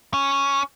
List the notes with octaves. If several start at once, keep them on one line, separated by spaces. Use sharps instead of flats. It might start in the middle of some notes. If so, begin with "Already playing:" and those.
C#4